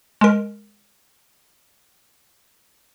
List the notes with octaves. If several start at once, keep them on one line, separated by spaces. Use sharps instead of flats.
G#3 A#4